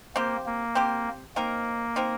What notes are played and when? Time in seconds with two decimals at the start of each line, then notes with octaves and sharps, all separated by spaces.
0.16 A#3 C4 G4 C5
0.46 A#3
0.75 C4 G4 C5
1.36 A#3 C4 D#4 A#4
1.96 C4 D#4 A#4